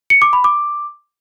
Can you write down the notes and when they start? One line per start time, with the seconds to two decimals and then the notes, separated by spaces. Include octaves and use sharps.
0.10 C#7
0.22 D6
0.33 B5
0.44 D6